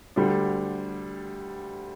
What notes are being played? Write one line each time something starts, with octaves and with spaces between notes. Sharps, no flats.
D2 D3 G3 D4